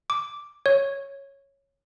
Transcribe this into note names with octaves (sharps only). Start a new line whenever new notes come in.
D6
C#5